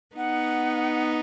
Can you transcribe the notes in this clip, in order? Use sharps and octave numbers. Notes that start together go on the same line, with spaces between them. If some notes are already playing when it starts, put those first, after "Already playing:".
B3 D#4 F#5